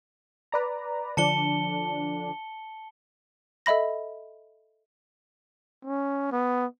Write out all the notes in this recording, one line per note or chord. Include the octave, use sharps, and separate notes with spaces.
B4 D5 A#5
D3 F3 D4 A5 C#7 G7
A4 D#5 E5 B5 A#6
C#4
B3